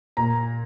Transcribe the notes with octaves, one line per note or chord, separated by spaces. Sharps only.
A#2 A#5